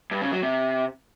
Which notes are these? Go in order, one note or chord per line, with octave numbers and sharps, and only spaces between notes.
G2
C#3
F#3
C3